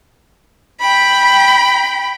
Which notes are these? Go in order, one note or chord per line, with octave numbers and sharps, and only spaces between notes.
G5 B5